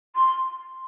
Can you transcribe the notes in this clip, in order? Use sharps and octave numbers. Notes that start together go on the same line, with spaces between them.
C6